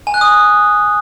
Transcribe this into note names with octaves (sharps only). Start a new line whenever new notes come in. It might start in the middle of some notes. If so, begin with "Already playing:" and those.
G#5
F#6
D#6